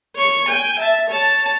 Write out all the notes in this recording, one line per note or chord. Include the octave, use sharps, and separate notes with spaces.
C#5 C#6
G5 G#5
E5 A5
C#5 A5